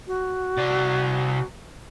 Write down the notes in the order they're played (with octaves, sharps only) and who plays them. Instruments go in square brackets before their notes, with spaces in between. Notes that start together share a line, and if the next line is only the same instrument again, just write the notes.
[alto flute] F#4
[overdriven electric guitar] C3 D5